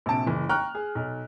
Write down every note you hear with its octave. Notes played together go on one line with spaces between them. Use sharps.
A#1 C3 A5 D7
F#1 E3
G5 A#5 C#6 F6 F#6
G#4
B1